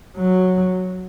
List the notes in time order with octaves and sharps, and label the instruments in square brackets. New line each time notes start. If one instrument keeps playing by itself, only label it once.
[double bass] F#3